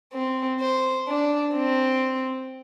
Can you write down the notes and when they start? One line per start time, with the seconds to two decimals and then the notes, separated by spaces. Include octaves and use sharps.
0.14 C4
0.61 C5
1.08 D4
1.54 C4